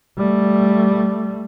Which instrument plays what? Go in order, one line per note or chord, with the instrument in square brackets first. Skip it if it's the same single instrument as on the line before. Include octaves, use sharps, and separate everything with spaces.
[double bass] G3 A3